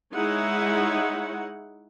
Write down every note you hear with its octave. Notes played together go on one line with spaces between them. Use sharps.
G#3 D#4 E4 C#5 F#5